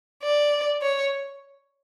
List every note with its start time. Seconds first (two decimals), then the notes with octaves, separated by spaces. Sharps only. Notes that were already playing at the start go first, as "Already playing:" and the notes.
0.23 D5
0.82 C#5